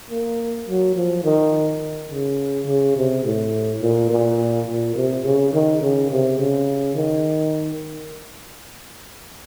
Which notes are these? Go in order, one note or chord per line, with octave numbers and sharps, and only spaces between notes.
A#3
F#3
F3
D#3
C#3
C#3
C3
A2
A#2
A#2
A#2
C3
C#3
D#3
C#3
C3
C#3
D#3